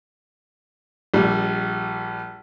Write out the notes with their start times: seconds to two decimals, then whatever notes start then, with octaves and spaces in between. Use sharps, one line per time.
1.14 A#1 G3